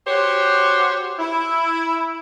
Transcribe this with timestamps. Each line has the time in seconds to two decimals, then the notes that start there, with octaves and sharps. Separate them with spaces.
0.07 F#4 G4 C5 C#5
1.19 E4